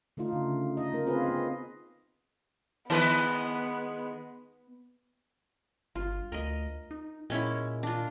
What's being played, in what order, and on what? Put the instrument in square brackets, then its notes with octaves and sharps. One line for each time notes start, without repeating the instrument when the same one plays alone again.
[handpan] D3 A3 D#4 F4
C#3
D#4 D#5
A#3 A#4
C4 F4 G#4 B4
B3 D#5
[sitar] D#3 G#3 B4 [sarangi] B3
[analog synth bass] G1 [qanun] F4
[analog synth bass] D2 [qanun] A#4 D#5
[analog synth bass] D#4
[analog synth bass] A#2 [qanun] G#3 C#4 E4
[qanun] D4 F4